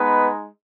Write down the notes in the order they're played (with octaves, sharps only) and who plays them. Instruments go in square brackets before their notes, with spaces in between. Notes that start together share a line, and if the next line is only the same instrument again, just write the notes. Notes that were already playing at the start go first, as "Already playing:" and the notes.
Already playing: [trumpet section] G#3 B3 D#4 B4